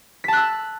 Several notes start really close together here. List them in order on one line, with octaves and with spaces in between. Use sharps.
B6 A5 F#6 E6